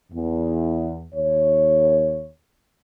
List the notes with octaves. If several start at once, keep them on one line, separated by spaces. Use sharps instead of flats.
E2
D#2 C#5